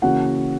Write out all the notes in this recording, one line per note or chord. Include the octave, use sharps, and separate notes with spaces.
C#3 E3 A#3 C#4 F#4 F#5